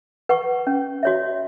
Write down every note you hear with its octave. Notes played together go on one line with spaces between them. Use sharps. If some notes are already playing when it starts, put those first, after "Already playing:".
B4 F#5 C#6
C#4
F#4 C#5 E5